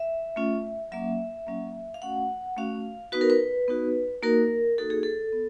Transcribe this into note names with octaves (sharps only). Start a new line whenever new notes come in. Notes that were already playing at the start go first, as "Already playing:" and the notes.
Already playing: E5
A3 C#4 F4
F#3 A#3 C#4 E5
F#3 A#3 C#4
F5
A3 C#4 F#4 F#5
A3 C#4 F#4 F5
B3 D#4 F#4 B4
A#4
B4
B3 D#4 F#4
A#3 D#4 F#4 A#4
A#3 D#4 F#4 A4
G#4
A4
B3